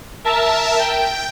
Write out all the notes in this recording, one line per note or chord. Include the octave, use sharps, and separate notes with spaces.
A#4 E5 A5
G5